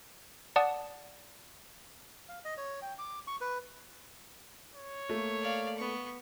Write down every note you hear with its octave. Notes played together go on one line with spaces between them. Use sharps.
D5 F#5 A5 D#6
F5
D#5
C#5
G5
D6
C#6
B4
C#5
A3 A#3
D5 F5
B3 C#6